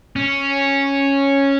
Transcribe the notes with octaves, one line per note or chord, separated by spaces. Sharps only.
C#4